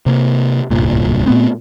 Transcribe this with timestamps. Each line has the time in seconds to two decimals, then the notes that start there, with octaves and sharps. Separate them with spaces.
0.06 C3 A#3
0.71 D1 C2 G2 A#2
1.26 A#2 A3 B3 C4